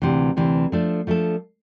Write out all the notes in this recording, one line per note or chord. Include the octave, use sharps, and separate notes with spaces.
D2 C3 E3
D2 C3 E3
F3 A3 D4 A4
F3 A3 D4 A4